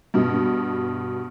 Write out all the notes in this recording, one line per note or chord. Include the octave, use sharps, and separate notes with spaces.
G2 B2